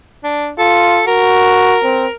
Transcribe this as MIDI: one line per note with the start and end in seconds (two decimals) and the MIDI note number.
0.24 0.50 62
0.58 1.01 65
0.58 1.06 69
1.07 1.78 66
1.07 2.13 70
1.84 2.07 60